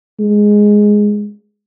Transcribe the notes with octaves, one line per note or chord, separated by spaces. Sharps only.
G#3